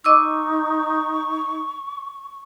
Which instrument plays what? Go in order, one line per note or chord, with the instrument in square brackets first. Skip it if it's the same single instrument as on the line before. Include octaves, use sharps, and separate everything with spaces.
[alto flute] D#4 [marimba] D#5 D6 E6 [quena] C#6